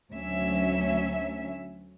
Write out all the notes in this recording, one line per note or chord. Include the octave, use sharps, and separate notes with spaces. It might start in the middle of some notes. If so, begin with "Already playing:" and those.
D2 F#3 C#4 E5